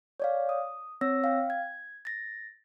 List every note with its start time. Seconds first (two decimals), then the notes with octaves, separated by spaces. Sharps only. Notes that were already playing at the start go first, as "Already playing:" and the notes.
0.20 C#5 D5 F5
0.49 D#6
1.01 C4 C#5 E6 A#6
1.24 F5 G5
1.50 G#6
2.05 A6 A#6